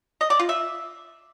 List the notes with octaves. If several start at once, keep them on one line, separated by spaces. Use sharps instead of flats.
D#5
D5
F4
E5